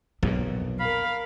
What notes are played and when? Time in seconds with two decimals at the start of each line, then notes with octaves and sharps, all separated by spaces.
0.23 B1 F2 A#2 D4
0.80 A#4 F5 B5